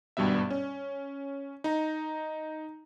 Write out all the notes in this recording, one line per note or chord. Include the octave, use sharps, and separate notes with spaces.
G#1 G2 B2 G3 B3 E5
C#4
D#4 A#5